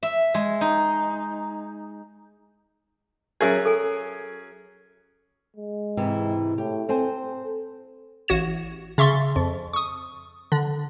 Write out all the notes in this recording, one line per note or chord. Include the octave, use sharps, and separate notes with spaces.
E5
G#3
D#4
F#3 C#4 G#4 A#4 E5 G#5
A4 G#5
G#3
G#2 C3 E3
A2 G4
C4 A4 C5 G#5
A1 F#4 G#6 E7
C#3 E5 C6 C#6 A6
F2
C#6 D#6
D3